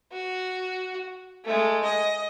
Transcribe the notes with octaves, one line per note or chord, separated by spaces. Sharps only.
F#4
G#3 A3
D#5